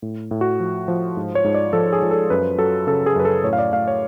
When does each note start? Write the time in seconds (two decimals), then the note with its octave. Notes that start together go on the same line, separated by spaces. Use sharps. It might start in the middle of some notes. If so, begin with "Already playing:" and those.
0.02 A2
0.31 A2
0.41 F#4
0.60 F3
0.88 F3
1.17 G#2
1.35 C#5
1.44 G#2
1.54 D5
1.73 F3 A4
1.93 G#4
2.03 F3
2.11 A4
2.30 F#2 B4
2.58 F#3 A4
2.87 C#3 A4
3.06 G#4
3.16 F#2 B4
3.25 A4
3.44 A2 C#5
3.53 F5
3.59 D5
3.72 A2 F5
3.88 C#5